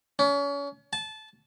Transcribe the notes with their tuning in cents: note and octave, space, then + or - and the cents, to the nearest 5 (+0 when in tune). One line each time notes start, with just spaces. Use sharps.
C#4 +35
A5 -20